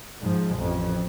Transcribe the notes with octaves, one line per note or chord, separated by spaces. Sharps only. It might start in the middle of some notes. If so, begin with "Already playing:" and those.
G#2 F3
A1 F2